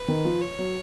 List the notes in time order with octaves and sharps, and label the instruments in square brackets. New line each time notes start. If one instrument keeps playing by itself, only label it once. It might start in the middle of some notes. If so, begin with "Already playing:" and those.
Already playing: [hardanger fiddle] B4
[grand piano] D#3
F3
[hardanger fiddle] C#5
[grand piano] F#3